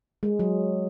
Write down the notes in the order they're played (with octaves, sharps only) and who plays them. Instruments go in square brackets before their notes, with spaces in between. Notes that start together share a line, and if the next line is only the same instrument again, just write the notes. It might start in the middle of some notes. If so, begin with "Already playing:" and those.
[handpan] G#3
F#3